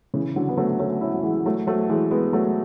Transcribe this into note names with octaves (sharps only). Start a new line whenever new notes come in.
C#3 E3
D3 F#3
B3
F#3 A3
A3 C#4
C#4 E4
F#3
E3 G#3
F#3 A3
F#3 A3
E3 G#3
G#3 B3
F#3 A3